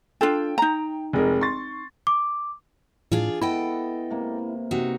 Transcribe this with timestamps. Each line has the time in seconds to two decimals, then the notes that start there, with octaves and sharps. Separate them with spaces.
0.21 D4 F4 A4 G5
0.58 D#4 A#5
1.13 F1 G#3 A#4
1.41 C6 C#6 A6
2.07 D6
3.12 A2 D4 F4 G#4
3.41 B3 E4 A4 D#5 G5
4.10 C3 A#3
4.71 C3 D#4 F#4